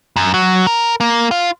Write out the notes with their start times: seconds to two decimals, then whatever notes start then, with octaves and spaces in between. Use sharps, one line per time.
0.16 F#2
0.34 F#3
0.67 A#4
1.00 A#3
1.31 F4